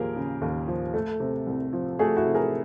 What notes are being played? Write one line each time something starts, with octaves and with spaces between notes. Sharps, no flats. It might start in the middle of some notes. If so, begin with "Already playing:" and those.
Already playing: D#2 F3 A#3 G4 G#4 A#4
C#3
D#2
F3
A3
C3
C2
F3
A3 F#4 G#4
E4 F#4
C3
G#4 A#4